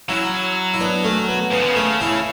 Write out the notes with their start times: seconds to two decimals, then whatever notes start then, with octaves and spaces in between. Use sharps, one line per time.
0.09 F#3 C#4 E4
0.74 E4
0.80 B3 D4
1.04 A3 C#4
1.29 B3
1.52 C#3 B3
1.61 D3
1.69 C#3
1.75 A3 C#4
2.01 C#4 E4